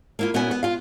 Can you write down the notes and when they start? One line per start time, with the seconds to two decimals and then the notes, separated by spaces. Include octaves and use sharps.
0.19 A#3 E4 F4
0.34 A#2 B3 C#4 E4 F#4 G#5
0.51 B3
0.63 F4 F5